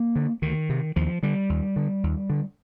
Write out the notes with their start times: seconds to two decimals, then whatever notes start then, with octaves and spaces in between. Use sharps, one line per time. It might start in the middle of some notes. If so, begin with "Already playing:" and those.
Already playing: A#3
0.16 D3
0.42 D2 D#3
0.69 C3
0.96 D#2 F3
1.23 D3 G3
1.49 D#2
1.76 D3
2.03 D#2
2.30 D3